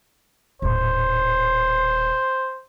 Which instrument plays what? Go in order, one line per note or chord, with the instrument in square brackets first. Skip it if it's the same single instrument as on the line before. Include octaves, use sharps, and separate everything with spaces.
[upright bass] D#1 A2 [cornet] C5